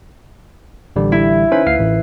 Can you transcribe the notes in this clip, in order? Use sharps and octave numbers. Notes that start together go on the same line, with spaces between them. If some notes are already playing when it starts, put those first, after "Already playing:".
A1 D3 G3
E4
C#4 D#4 B4 C5
D2 F5 C7
A1